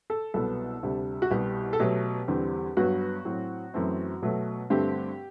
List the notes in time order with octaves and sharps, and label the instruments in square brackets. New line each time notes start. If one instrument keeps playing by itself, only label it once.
[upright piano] A4
C2 B2 F#3 B3 A4
D2 C3 G3
F#4
C2 B2 G3 G4
A4
B2 F#3 A3 G4
E2 D3 G3 C4
G2 F#3 B3 F#4
A2 F#3 C4
F#2 E3 A3 C4
B2 F#3 A3
G2 D3 A3 C4 G4